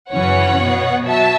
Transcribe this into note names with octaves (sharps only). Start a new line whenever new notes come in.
F#2 C#3 E3 C#4 C#5 F#5
B2 B3
F#3 E5 A5